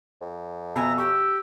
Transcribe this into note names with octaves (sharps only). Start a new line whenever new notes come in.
F2
B2 E5 G#5 A#5
G4 C#6 E6